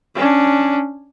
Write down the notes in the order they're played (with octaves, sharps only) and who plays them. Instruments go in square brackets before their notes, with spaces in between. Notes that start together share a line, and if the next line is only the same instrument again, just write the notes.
[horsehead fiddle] C#4 D4